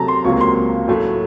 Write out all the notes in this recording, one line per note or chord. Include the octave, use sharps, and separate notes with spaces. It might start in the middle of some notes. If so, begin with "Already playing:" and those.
Already playing: C3 F#3 A3 A5 A#5
C6
C#2 C3 F#3 A#3 F4 C#6
C6
A2 F#3 A3